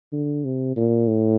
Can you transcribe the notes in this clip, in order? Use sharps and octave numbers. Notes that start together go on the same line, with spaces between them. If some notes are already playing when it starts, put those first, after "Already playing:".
D3
C3
A#2
A2